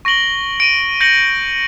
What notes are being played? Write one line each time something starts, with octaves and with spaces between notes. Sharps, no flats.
C#6 A#6 D7 F#7 G7
D7 D#7
G6 A#6 C#7 F#7